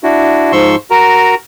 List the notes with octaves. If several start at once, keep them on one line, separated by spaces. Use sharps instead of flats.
D4 E4 F#4
G#2 F3 C6 C#6 E6
F#4 A#4 A#5